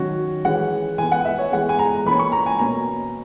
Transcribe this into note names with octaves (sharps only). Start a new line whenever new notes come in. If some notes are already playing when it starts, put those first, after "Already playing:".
Already playing: D#3 F#3 C#4 F#4
E3 G#3 C#4 F#5
E3 B3 G#5
F#5
E5
C#5
E3 G#3 B3 F#5
G#5
A#5
E3 A#3 C#4 B5
C#6
A#5
G#5
B2 A#3 C#4 A#5